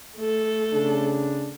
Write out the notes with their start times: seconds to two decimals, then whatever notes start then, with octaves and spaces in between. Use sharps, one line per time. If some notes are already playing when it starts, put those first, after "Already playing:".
0.17 A3 A4
0.73 C#3 D4